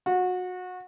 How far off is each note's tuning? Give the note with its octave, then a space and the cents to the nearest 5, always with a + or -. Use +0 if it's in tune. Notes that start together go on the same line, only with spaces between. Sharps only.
F#4 -25